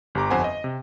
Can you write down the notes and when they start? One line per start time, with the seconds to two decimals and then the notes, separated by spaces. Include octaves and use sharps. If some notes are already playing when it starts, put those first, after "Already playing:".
0.15 G1 G4 A#5 D6
0.31 G1 F2 C5 F#5 G#5
0.44 D#5
0.64 C3